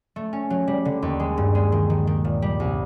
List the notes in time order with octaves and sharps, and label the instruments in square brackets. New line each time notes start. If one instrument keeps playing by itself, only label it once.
[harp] A3
C#4
F#3
G3
D3
D#2
G#3
G2
G#3
D#3
D#3
D#3
A#2
G3
C2